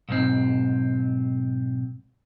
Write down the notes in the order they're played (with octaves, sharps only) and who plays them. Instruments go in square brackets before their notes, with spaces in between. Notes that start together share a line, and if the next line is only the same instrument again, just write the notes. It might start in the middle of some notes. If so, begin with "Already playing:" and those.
[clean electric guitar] B1 G#2 C4